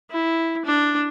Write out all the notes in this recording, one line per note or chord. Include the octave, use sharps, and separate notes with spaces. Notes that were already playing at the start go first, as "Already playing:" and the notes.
E4
D4